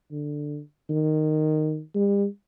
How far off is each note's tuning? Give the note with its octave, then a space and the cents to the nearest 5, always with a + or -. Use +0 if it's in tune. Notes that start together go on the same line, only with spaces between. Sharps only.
D3 +10
D#3 -10
G3 +40